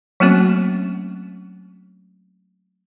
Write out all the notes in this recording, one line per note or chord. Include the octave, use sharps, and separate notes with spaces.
F#3 A3 A#3 C4 C#4 F#4